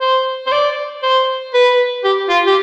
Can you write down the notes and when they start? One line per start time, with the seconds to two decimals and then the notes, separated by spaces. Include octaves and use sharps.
0.01 C5
0.47 C5
0.52 D5
1.03 C5
1.54 B4
2.04 G4
2.30 F4
2.47 G4